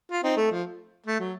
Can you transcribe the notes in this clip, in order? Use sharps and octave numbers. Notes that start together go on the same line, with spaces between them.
F4
C4 D#4
A3
F3
A3
F#3